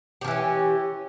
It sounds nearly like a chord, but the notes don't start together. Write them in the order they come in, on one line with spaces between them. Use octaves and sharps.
G4 F3 E3 C#4